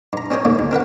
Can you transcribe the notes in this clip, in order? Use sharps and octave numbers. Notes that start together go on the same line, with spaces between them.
G2 A#5
C4 C#4 G#4 C5 C#5
G#2 C#3 A#3
D2
C4 A#4 B4 F#5